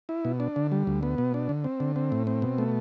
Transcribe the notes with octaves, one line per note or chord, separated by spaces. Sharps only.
E4
B2
D4
D3
G3
D2
B3
B2
D4
D3
C4
D3
C4
A2
C4
B2
A3